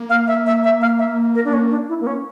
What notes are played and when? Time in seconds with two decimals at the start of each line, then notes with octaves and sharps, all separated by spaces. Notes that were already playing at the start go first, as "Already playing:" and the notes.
Already playing: A#3
0.10 F5
0.28 E5
0.46 E5
0.64 E5
0.81 F5
0.99 E5
1.35 A#4
1.45 D4
1.53 C#4
1.70 D4
1.89 E4
2.00 A#3
2.07 C#4